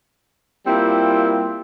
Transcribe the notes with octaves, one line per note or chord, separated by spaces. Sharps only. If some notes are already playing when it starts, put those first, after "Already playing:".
G3 A#3 C4 E4 F4